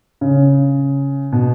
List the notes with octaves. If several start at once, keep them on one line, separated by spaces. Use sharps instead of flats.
C#3
B2